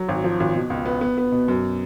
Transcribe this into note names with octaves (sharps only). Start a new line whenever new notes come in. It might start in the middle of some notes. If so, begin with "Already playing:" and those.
Already playing: F#3
G#1
F3
G#1
B2
C#2
B3
B3
B3
B2
F#2